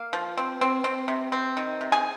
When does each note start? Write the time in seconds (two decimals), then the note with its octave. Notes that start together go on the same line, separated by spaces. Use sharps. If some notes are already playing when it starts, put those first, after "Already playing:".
Already playing: A#3 F5
0.13 F3
0.37 C4
0.61 C4
0.84 C4
1.08 C3
1.32 C4
1.57 D#3
1.81 C3
1.92 G#4 G#5